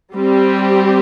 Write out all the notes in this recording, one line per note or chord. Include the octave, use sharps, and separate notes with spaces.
G3 C4 G4